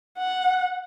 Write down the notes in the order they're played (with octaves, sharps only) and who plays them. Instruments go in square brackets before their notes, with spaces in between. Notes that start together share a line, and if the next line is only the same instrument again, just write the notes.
[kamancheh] F#5